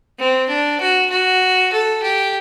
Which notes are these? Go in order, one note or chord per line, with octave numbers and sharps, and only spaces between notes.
C4
D4
F#4
F#4
A4
G4